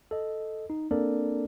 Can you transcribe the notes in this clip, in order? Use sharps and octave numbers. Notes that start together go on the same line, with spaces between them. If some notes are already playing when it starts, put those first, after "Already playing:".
A4 D#5
D#4
A#3 C4 D4 A4 A#4 D5